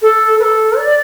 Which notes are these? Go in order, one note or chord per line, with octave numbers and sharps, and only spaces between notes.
A4
B4
A4
D5